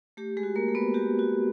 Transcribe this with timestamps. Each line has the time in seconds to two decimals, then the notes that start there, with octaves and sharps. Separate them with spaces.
0.17 A3 G4
0.37 G#3 G#4
0.43 F#4
0.56 A#3 A#4
0.69 A3
0.75 B3 B4
0.94 F#4 G4
1.19 F#4